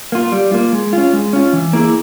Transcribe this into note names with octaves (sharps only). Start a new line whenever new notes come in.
A#3 F4
G3
A#3 F4
G#3
C#4 F4
G#3
C#4 F4
E3
A#3 E4 G#4